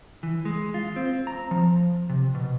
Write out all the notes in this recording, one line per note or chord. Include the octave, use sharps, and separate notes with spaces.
E3
G#3
F4
C4
A#5
F3
C3
B2